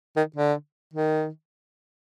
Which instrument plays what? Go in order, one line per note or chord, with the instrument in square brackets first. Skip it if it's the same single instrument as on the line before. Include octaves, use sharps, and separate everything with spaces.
[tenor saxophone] D#3
D3
D#3